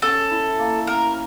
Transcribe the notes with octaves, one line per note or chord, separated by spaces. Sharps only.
C#4 A4
E4
A#3
C#4 A#4